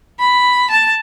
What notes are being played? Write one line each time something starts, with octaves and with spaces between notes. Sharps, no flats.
B5
A5